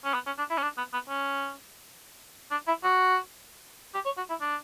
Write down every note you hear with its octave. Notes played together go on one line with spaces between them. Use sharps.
C#4
B3
C#4
D4
E4
C#4
D4
B3
B3
C#4
D4
E4
F#4
G4
C#5
F#4
E4
D4